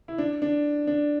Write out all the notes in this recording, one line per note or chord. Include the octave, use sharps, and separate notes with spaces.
E4
D4
D4
D4